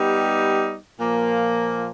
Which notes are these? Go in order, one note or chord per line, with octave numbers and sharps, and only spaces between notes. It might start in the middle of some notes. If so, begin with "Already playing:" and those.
Already playing: G3 B3 D#4 G4
A#2 F3 A#3